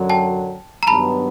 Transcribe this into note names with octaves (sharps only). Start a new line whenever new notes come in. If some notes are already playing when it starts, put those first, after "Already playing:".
Already playing: F#2 D3 F#3
G5 A5
A#5
G2 D#3 F#3 B3 A5 B5